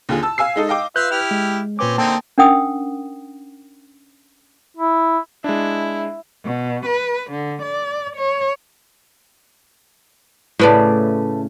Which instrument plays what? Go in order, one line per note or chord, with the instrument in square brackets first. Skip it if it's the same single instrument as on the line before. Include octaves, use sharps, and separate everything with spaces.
[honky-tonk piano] D#2 D3 F4 G#4
A5 E6
F5 G#5 E6 C7
G#3 D#4 A4
D#5 F5 G5 D6
[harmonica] F4 E5 F5 [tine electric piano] B4 F#6 G6
[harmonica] E4 G4 F6
[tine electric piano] G#3
[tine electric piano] A#2 B4 D6 [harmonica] C4 C#4
[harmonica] D3 C4 D#4 [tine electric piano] A#3 G5 A5
[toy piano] C#4 D4 A#4 F#5 G5 D#6
[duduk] E4
[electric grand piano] G#3 D4 [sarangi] E4
[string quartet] B2
B4
D3
D5
C#5
[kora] A2 C#3 [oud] A3 B4 D5